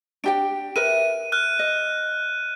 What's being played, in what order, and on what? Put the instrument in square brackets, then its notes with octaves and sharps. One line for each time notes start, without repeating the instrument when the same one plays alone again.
[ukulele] D4 G4 G5 [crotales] D7
[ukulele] A#4 B4 E5 [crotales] D#7
[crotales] F6 F#6
[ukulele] D#5